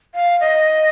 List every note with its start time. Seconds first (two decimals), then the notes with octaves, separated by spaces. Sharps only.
0.15 F5
0.40 D#5